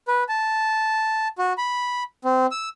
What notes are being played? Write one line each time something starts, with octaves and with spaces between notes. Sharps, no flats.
B4
A5
F#4
B5
C4
E6